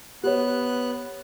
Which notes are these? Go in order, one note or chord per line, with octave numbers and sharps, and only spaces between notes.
B3 G4 C#5 F#6